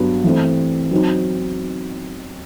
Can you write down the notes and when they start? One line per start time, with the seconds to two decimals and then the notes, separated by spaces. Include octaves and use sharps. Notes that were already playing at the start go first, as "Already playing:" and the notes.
Already playing: G2 F#3 B3
0.24 E3 A3 C4
0.91 F#3 C4 D#4